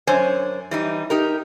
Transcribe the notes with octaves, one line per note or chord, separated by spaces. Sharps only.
F#2 D4 C5 C#5 G#5
E3 G3 D#4
D#4 G4 A#4